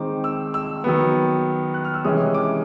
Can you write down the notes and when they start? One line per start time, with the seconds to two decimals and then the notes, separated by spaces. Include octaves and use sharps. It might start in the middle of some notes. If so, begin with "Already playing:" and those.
Already playing: D#3 G#3 C4 D#4 D6
0.24 E6
0.54 E6
0.84 D#3 F#3 B3
1.74 F#6
1.84 F6
1.94 E6
2.04 C3 E3 G#3 C#4 D#6
2.35 D6